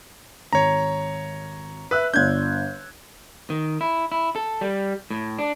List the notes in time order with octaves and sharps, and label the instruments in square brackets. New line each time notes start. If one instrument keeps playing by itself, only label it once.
[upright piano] G#1 [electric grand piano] C#5 A#5
[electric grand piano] B4 [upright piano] E5 E6 F#6
[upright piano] G1 D4 [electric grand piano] G6 G#6
[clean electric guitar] D#3
E4
E4
A4
G3
A2
D4